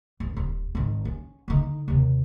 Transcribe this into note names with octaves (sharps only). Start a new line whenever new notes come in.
G1
D#1
G#1 D#3
C#4
D3 D#4
D#2 C3